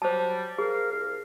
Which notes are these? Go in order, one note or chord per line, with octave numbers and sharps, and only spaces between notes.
F#3 G3 C5 A5
G#4 A#4 F5
C2 A#4 F5